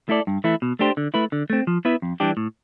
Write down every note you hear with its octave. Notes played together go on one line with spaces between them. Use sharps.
A3 E4 A4 D5
G2
E3 A3 E4
B2
A3 D4 G4 C5
D3
A3 E4 B4
D3
A3 C4
F3
B3 E4 B4 E5
F2
E3 G3 D4 G4
A2